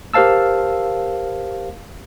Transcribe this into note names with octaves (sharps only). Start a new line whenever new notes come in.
G4 A#4 C5 F5 A5 E6